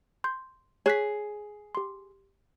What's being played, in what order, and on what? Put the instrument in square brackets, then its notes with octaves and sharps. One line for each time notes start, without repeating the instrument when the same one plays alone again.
[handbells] C6 G6
[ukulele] G#4 [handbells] C#5 F#6 B6
[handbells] G4 C6